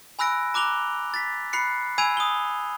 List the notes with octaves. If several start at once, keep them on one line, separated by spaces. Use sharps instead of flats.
G#5 B5 E6 F#6 A#6 D7
A#5 D6 F#6 F7 G7
A6 B6
B5 F#6 C7 C#7
G#5 B5 E6 G#6 D#7 F7
D#6 G7